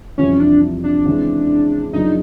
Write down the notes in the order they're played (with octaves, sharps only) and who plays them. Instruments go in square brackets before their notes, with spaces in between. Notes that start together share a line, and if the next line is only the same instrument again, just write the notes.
[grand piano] F2 C3 E3 G3 [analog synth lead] C#4
[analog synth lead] D4
D4
[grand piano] C#3 E3 G#3 C4
[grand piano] F#2 C#3 F3 A#3 D4 [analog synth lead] D#4